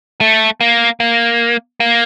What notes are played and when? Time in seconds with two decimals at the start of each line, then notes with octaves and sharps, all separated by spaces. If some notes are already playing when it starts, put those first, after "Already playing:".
0.21 A3
0.61 A#3
1.00 A#3
1.80 A#3